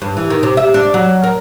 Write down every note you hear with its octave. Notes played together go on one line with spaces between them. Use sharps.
G2
E3
D#3
C3
E5
D4
F#3
A#4